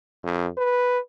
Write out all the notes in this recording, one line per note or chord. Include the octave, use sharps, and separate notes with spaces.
F2
B4